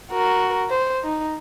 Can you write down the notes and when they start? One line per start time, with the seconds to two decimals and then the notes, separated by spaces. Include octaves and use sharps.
0.11 F#4 A#4
0.70 C5
1.04 D#4